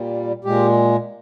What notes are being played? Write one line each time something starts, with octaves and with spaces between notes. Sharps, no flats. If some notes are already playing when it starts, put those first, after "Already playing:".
Already playing: A#2 G3
A#2 G#3 G4